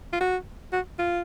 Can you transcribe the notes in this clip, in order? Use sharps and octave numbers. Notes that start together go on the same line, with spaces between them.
F4
F#4
F#4
F4